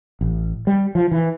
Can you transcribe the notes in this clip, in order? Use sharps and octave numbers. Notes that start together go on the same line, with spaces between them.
A1
G3
F3
E3